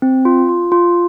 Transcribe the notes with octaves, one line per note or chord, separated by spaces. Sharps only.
C4
F4
F4
F4